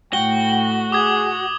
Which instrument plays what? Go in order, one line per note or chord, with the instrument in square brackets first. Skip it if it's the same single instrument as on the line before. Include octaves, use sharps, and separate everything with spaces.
[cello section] A2 [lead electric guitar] F#4 [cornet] G5 [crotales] G7
[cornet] G#4 [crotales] D6 D#6 G#6